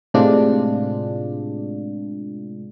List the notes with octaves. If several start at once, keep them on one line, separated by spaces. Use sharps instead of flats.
A2 C3 G#3 D4 F4